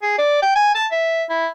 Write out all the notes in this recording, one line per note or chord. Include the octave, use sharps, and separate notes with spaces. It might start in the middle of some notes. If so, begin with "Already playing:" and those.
G#4
D5
G5
G#5
A5
E5
E4